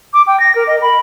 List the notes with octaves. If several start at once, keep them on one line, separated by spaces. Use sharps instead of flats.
D6
G5
A#6
A#4
D#5
B5